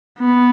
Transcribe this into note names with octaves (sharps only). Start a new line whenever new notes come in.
B3